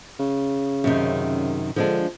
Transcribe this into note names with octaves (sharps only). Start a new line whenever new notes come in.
C#3
F#2 C3 D#3
D3 F3 G#3 D4